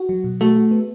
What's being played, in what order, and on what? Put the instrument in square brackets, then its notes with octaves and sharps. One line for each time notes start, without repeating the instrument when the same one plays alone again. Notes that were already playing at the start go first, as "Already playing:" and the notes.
Already playing: [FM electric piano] F#4
F#3
B2
[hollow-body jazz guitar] A3 [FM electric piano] F#4
[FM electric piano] F#4
B3